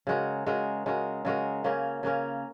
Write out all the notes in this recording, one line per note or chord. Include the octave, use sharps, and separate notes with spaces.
C#3 G#3 F#4 A#4
C#3 G#3 F#4 A#4
C#3 G#3 F#4 A#4
C#3 G#3 F#4 A#4
C#3 A#3 C#4 A#4
C#3 A#3 C#4 A#4